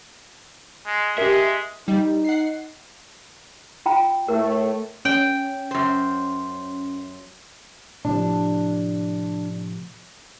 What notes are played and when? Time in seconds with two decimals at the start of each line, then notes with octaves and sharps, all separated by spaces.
0.87 G#3
1.18 G#3 G4 A#4 E5
1.88 G3 D#4
2.25 F#5 C7
3.86 F4 G5 A#5
4.28 A2 A3 A#4
5.05 C#4 G5
5.71 F#2 C5
8.05 A2 C3 F3 D4